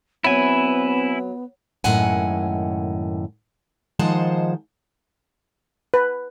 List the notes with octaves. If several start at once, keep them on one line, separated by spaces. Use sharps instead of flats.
F#3 B3 C4 E4 G#5
F#2 A2 D#3 G#3 F#5 G#5
D#3 F3 G#3 C5 F#5 A5
B4